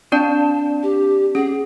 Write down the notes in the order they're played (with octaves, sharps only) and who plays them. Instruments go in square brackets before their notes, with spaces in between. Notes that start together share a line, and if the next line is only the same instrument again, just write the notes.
[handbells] C4 D4 D5 [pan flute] A5
[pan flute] G4
[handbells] C#4 [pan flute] G#4